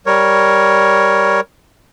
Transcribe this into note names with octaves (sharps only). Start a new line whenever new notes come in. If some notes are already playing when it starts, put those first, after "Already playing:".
G3 A#4 C#5